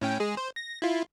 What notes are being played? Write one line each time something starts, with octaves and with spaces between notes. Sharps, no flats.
A2 C#4 G5
G#3 G#4
C5
A#6
E4 F4